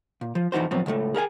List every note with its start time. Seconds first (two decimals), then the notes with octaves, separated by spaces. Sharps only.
0.21 A#2
0.35 F3
0.52 F2 E3 D#4 F#4 C5
0.71 A2 F3 F#3 B3 C4
0.86 C#2 A2 G#3 A3
1.14 G#4 A#4 E5 G#5